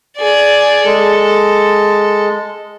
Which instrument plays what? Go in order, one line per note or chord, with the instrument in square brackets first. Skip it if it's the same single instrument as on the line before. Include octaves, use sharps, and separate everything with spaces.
[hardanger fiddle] G#4 D5
[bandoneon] G#3 [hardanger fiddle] A4